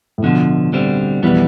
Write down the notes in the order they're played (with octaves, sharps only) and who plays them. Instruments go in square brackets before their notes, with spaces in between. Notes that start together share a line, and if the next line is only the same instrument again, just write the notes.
[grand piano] A2
[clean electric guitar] D2 D3 F3 [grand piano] B2
[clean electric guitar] D2 D3 G3 C4
[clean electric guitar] F2 E3 G3 B3 [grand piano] B2